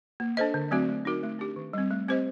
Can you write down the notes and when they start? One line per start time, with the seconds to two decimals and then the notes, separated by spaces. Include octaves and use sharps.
0.20 A#3
0.37 D4 A4 C5 D#5
0.54 D3
0.71 F#3 A3 C4 F#4
0.88 A3
1.05 D#4 F#4 A#4
1.23 A3
1.39 D4 G4
1.56 D#3
1.73 G3 C4
1.91 A3
2.08 C4 G4 C5 D#5